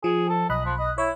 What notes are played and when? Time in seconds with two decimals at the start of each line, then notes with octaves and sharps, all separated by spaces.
0.04 F3 G#4
0.29 A4
0.50 B1 D#5 B5 F#6
0.66 F3
0.79 D#5
0.98 E4 C#5